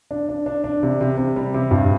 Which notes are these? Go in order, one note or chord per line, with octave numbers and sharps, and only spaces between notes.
D4
D4
D4
D4
C3
C3
C3
G3
C3
G2